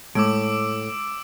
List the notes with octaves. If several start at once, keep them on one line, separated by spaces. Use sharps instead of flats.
A2 G#3 D6 E6 D7